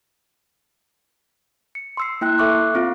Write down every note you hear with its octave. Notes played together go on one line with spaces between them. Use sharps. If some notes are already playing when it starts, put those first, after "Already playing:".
C#7
C6 E6 C7
A#3 E4 G5 F#6
A4 E5 C#6 D6 E6 F#6
C4 F4 F5